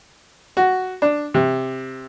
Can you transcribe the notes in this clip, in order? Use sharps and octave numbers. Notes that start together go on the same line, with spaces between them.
F#4
D4
C3